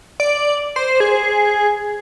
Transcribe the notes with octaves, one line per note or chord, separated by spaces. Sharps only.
D5
C5
G#4